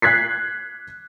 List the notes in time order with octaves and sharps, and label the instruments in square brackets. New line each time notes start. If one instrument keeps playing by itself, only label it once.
[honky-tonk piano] F#6 G#6 B6 C7